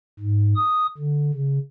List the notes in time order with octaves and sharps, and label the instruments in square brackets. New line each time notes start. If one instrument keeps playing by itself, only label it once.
[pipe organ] G#2
D#6
D3
C#3